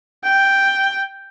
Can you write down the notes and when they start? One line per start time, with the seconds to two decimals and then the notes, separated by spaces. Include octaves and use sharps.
0.23 G5